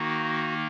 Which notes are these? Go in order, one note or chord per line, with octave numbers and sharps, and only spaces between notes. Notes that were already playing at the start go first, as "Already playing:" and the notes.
Already playing: D#3 A#3 D#4 F#4